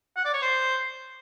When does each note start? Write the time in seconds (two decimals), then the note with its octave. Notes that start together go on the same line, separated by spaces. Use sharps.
0.17 F#5
0.25 D5
0.34 C#5
0.42 C5